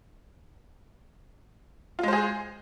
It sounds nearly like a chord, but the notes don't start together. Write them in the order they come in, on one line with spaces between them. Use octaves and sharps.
F4 G#3 C5 G#4